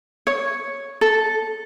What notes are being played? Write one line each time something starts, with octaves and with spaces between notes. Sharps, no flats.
C#5
A4